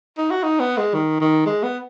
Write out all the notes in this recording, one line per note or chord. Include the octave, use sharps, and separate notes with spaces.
D#4
F#4
D#4
B3
G#3
D#3
D#3
G#3
B3